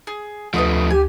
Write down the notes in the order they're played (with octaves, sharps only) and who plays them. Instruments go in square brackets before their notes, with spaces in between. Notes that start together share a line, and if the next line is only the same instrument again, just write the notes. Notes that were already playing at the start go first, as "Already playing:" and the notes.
[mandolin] G#4
[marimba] D2 [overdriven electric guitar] F3 A3 [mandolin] B4 D#5 C#6
[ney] G4 [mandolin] G#5